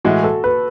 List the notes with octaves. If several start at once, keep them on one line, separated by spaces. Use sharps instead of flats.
A2 E3 G#3 F#4
A4
B4